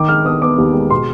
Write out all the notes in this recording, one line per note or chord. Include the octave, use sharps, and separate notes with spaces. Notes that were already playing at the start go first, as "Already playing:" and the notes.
Already playing: D#3 D6
G#3 F6
B3 D#6
B3 D6
D#2
G#3
B2 C6